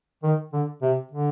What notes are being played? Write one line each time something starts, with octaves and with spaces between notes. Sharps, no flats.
D#3
D3
C3
D3